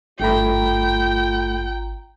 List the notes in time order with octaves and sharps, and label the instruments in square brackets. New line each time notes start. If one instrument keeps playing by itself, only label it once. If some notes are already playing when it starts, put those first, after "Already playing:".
[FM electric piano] G#1 A#5 [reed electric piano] G2 A3 B5 [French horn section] F4 [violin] G5